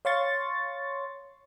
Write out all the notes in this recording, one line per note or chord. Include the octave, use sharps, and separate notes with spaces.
C#5 F5 C6 C#6 A6